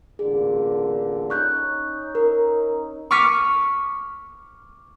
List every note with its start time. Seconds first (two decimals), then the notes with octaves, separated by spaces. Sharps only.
0.19 A1 A#2 D3 G#4
1.30 C#4 D#4 C#6 F#6 G6
2.15 A#4
3.11 C#6 D6 F6 B6 C#7 D#7